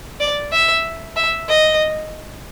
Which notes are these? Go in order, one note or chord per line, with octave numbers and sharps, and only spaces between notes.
D5
E5
E5
D#5